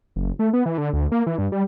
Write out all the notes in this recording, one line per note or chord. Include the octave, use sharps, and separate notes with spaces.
F#1
A3
B3
E3
D3
D2
A#3
E3
G2
G3